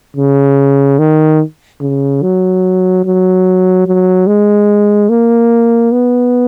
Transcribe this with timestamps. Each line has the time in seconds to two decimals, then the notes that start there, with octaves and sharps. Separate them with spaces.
0.17 C#3
0.99 D#3
1.80 C#3
2.22 F#3
3.05 F#3
3.86 F#3
4.27 G#3
5.09 A#3
5.92 B3